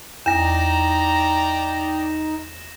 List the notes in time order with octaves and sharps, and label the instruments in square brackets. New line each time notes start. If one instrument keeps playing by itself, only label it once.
[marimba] E2 [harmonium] D#4 [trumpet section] D5 G5 A#5 [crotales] A#6 E7